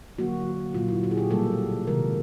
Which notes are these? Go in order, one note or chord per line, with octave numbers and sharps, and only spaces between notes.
D3 F#3 A#3 F#4
A#2 F#3 A#3 F4
E4
F#4
G#4
G4
B2 G3 A#3 A4
C3 D#3 G#3 A#4